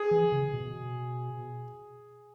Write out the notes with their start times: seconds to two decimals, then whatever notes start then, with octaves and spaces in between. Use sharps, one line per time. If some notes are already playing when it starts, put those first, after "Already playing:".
Already playing: G#4
0.11 E3
0.32 C#3
0.53 B2